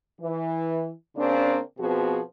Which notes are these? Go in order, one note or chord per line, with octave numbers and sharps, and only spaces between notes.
E3
C#3 A#3 C4 D4
B2 F3 B3 C4 F#4 G#4